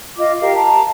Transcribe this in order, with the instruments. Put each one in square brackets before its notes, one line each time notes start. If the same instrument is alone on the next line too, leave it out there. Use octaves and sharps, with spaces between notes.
[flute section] F4 D#5 D6
G4 A#4 F5
[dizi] A5 [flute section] A#5